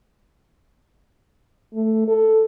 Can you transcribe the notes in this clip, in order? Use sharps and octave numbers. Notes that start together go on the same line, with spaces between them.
A3
A4